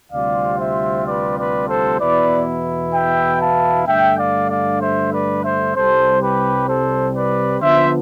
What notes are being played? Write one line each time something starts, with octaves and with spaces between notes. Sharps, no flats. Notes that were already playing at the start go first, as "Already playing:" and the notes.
D2 C3 G3 C4 F4 D5 F5
C5 E5
B4 D5
B4 D5
A4 C5
E2 B2 B3 E4 B4 D5
E5 G5
F5 A5
G2 D3 A3 E5 G5
D5 F5
D5 F5
C5 E5
B4 D5
C5 E5
C2 C3 G3 C4 A4 C5
G4 B4
A4 C5
B4 D5
D3 F3 B3 F4 C5 E5